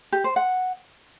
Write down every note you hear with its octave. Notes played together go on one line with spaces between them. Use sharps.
G4
C5
F#5